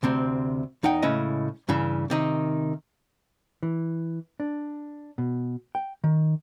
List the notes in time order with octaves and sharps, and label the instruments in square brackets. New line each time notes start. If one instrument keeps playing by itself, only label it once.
[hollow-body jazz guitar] D2 C3 C4
E2 D#4 F#5 G5
A2 C#3 G#3 C#4 E4 D#5
G2 C#3 E3
C3 D#3 D#4
E3
D4
B2
G5
D#3